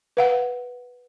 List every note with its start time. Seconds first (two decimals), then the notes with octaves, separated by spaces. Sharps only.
0.17 B4 F5 F#5